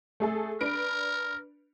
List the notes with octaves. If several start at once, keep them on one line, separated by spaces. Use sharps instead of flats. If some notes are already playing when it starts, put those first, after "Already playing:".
A3 G#4 A4
D4 A#4 B4 D7